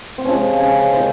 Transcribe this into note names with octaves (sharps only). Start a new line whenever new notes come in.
C4
C3 F3 G#3 C#4
C#3 G#3 G#4
C3 D#3 G#3 C5